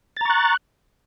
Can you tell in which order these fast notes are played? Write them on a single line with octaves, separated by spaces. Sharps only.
A6 A#5 C#6 F#6